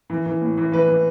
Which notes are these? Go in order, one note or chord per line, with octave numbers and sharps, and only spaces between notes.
E3
E3
A2
E3
E3 B4
E3